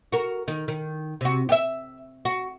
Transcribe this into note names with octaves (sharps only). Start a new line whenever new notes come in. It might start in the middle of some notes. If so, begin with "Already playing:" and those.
F#4 A#4
D#3 A#4
D#3
C3 F#4
G4 E5
F#4